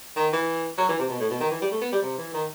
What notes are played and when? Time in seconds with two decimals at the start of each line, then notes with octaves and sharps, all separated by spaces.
0.16 D#3
0.32 E3
0.78 F#3
0.89 E3
0.99 C3
1.09 B2
1.19 A2
1.30 B2
1.40 D#3
1.50 E3
1.61 G3
1.71 A3
1.81 B3
1.92 G3
2.02 C3
2.17 E3
2.33 D#3